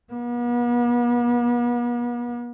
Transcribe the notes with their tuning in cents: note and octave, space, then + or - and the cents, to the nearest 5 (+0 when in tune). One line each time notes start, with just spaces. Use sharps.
B3 -45